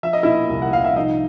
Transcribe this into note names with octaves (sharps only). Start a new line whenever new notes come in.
F3 E5
D#5
A#2 E4 E5
C2
F#5
C2 F5
E5
F3 D#4 D#5